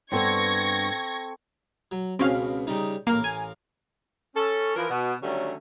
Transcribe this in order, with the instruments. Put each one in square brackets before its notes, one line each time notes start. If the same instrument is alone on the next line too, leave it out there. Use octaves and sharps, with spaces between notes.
[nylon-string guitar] G2 B3 [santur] C4 A4 [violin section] C#6 G#6 A#6
[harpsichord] F#3
[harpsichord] C#2 B2 [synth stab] C4 C#4 F5
[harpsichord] C#3 G3 D#4
[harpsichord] A1 A#4 F5 [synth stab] A#3
[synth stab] G#5
[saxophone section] C#4 A4
E3 F3 A#4
B2
D3 D#3 F#3 G3 A3 C#4